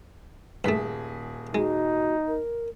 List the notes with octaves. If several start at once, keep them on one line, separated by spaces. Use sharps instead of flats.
D#1 G2 A3 G#4 B6
G#3 D#4 F#4
A#4